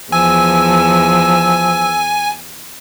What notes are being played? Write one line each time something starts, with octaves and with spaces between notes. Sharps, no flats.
E2 F3 G#5 E6